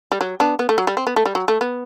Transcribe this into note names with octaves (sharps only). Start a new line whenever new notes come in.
G3
F#3
B3 D4
B3
A3
F#3
G3
C4
B3
A3
G3
F#3
A3
B3